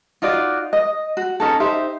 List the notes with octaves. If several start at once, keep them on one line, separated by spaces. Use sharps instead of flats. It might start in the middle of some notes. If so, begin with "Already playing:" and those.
D#4 F4 F#4 D5
D#5
F#4
C#4 D#4 A4
D#4 G4 C5 E5